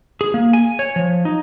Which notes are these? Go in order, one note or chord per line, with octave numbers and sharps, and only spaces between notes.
G#4
A#3
G#5
C#5
F3
D#4